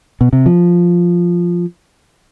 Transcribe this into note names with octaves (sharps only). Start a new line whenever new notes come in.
B2
C3
F3